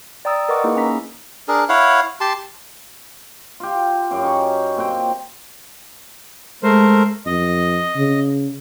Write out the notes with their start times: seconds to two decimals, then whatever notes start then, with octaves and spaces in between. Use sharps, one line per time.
0.25 D5 G5 A#5 D#6 E6 A6
0.49 A#4 B4 D#5 F#5 C#6 D6
0.64 A#3 D#4 E4 G#4
0.76 C#4 A#5 B6
1.48 D4 G#4 A#4
1.69 E4 C#5 F5 F#5
2.21 G4 A5 C6
3.60 F4 G4
4.11 F#2 G4 D5 F5
4.23 C#4 D#4 B5 C#6
4.77 A#2 C4 G4 G5
6.63 G#3 A3 A#4 C5
7.26 F2 D#5
7.96 C#3